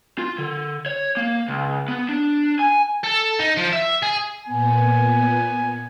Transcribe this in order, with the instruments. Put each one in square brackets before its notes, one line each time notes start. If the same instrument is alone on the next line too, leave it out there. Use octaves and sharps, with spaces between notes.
[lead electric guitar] F4
D3
C#5
A#3
C#2
B3
D4
G#5
[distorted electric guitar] A4
D#4
F3
E5
G#4
[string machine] A#2 B3 [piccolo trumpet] G#5